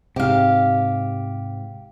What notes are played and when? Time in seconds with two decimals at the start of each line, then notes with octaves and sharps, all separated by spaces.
0.16 G#2 C3 G4 F5